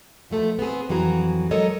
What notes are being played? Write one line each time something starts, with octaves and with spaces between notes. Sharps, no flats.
B2 F3 A3 A4
B3 C4 G#4
F2 E3 F#3 F#4 G#4 A#5
F#3 G#3 A4 A#4 C#5 D#5